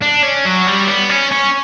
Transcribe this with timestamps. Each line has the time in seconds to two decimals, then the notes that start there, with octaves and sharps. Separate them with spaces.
0.02 D4
0.23 C#4
0.45 F#3
0.67 G3
0.87 B3
1.09 C#4
1.31 C#4